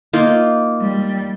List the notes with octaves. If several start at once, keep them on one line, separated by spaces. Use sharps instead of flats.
A#3 D#4 F4
G3